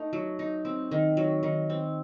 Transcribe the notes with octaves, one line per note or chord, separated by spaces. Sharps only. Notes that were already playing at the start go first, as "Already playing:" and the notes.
Already playing: A3 D#4
F#3
D#4
C4
D#3
F#3
D#3
C4